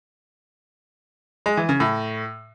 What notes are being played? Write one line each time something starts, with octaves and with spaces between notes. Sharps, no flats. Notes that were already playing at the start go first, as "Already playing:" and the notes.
G#3
E3
C#3
A2